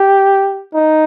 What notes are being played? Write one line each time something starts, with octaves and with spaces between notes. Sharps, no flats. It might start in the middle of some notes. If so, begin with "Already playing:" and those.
Already playing: G4
D#4